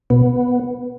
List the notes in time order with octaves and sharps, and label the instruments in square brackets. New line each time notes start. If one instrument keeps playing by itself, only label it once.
[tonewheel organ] B2 B3